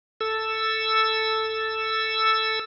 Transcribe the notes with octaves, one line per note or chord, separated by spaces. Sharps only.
A4 E6